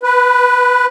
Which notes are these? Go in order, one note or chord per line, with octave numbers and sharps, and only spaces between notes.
B4